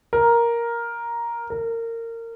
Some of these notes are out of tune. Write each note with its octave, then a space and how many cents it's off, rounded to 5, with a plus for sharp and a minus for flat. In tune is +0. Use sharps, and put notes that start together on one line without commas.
A#4 +5
A#4 -25